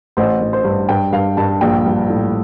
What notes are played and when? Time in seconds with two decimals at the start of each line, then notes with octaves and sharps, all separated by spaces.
0.17 A1 C5
0.41 A1
0.53 C5
0.64 G2
0.89 G2 G5
1.12 G2 F5
1.37 G2 A5
1.61 A#1 G5
1.86 G3
2.10 A2